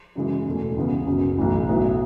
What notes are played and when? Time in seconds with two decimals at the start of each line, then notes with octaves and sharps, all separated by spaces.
0.15 F#2 C#3 E3 G#3
0.46 E2 B2 A3
0.76 C#2 C#3 E3 B3
1.06 F#1 F#2 C#3 F#3
1.38 B1 A2 E3
1.69 B1 A2 F#3 B3 E4